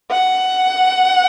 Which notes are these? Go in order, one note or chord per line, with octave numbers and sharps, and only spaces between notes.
F#5